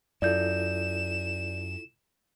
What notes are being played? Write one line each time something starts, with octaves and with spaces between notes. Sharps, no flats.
F#2 E4 F4 A4 D5 G6 E7